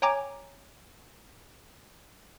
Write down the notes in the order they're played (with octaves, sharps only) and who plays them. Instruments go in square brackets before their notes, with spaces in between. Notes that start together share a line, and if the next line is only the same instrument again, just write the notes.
[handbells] C#5 G5 G#5 A#5 D6